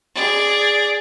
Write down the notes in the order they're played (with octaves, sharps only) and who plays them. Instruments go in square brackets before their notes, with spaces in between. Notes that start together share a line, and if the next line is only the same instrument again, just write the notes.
[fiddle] G#4 D5